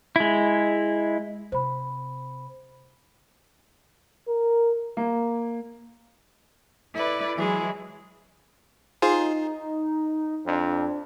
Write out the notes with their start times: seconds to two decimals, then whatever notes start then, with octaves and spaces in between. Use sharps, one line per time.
0.16 G#3 E4
1.52 C3 C5 B5
4.28 A#4
4.97 A#3
6.93 E4 A4 B4 D5
7.36 E3 F#3 G#3 E4 G#4
9.02 D#4 F4 G#4 C5
10.46 F2 D4